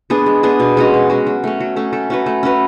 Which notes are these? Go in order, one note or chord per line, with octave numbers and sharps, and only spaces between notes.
B3 D4 G#4
G#3
B3 D4 G#4
B2
G#3 C#4 F#4
B2
G#3 C#4 F#4
F#3
A3 C#4
F#3
A3 C#4
A3
C#4 F#4 B4
A3
C#4 F#4 B4